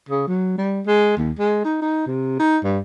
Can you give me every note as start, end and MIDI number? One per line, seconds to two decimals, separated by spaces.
0.09 0.24 49
0.28 0.57 54
0.58 0.81 55
0.86 1.14 56
1.17 1.32 39
1.39 1.64 56
1.65 1.78 63
1.82 2.07 63
2.07 2.39 48
2.39 2.58 63
2.64 2.80 43